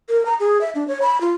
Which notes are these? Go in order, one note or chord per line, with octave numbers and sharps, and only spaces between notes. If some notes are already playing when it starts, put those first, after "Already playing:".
A#4
A#5
G#4
E5
D4
C#5
B5
F4